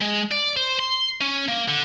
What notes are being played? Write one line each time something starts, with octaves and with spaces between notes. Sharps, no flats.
G#3
D5
C5
C6
C#4
A#3
D3